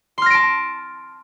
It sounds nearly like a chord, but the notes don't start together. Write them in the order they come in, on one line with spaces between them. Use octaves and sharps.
C6 F6 A#6 D7 A5